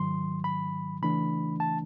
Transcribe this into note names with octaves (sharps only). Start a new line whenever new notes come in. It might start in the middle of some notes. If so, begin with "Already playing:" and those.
Already playing: G#2 D#3 F#3 C6
B5
C#3 E3 A3 D4 B5
A5